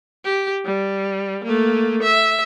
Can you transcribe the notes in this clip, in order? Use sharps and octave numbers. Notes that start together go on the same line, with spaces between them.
G4
G3
A3 A#3
E5